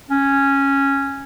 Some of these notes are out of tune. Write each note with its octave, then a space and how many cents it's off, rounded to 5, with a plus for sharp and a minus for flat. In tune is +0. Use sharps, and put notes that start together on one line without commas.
C#4 -5